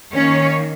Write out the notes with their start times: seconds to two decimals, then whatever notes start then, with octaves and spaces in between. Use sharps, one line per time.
0.15 D#3 A#3 C#4 C#5